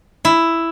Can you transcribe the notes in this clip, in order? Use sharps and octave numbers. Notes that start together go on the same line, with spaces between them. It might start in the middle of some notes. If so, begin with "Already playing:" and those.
E4